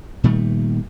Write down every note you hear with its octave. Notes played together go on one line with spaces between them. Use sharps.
A#2 D#3 G3 A3